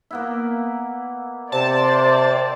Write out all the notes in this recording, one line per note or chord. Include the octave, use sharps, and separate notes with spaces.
A#3 B3 E4
C3 C5 D5 A5